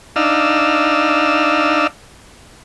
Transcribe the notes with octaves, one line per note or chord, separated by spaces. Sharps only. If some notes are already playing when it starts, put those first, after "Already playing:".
D4 D#4 F5 E6